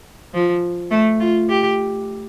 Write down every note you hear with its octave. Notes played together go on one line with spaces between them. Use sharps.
F3
A3
F4
G4